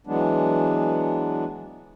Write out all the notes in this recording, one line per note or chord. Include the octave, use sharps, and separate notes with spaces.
E3 F#3 G#3 B3 D4